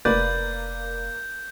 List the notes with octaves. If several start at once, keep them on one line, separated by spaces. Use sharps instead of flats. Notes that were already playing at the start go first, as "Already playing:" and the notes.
F1 A#3 B4 D5 G6